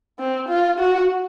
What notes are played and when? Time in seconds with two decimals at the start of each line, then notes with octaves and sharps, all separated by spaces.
0.19 C4
0.49 F4
0.79 F#4